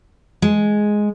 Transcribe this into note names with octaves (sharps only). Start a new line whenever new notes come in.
G#3